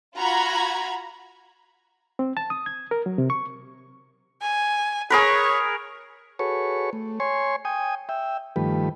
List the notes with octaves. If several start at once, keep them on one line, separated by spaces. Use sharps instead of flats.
F4 F#4 A#5 B5 G#6
C4
A5
D#6
G#6
A#4
F#3
C3
C#6
G#5
G#4 A#4 B4 C#5
F#4 G#4 A4 B4 C#5 C#6
A3
C#5 G#5 C6 C#6
G5 G#5 D#6
E5 G5
G2 D#3 F3 A3 G4 B4